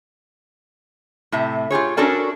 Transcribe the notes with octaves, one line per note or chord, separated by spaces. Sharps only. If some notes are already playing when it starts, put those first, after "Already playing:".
A2 C3 E5
F4 G4 G#4 C#5
C#4 D4 F#4 A4 A#4 D5